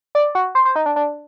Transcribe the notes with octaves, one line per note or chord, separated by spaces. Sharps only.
D5
F#4
C5
C5
D#4
D4
D4